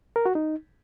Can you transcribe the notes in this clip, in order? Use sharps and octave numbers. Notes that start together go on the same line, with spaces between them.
A#4
F#4
D#4